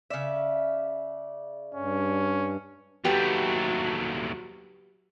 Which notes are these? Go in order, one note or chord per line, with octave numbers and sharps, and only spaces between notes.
C#3 D5 E5
G2 C#4
D#2 F#3 A3 G4 B4 F#5